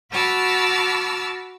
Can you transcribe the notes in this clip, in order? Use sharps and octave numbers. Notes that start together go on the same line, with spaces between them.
F#4 A5 B5 D6 E6 F6